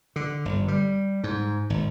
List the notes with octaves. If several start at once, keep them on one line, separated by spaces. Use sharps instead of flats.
D3
G1
G3
G#2
G#1